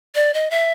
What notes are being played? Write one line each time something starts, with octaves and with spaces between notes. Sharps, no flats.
D5
D#5
E5